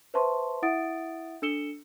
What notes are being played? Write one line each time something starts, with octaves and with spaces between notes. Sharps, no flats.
B4 C5 E5 A5 C6 C#6
E4 E5 F#5 D#6 A6 D7
D4 A4 E6 C#7 E7 G7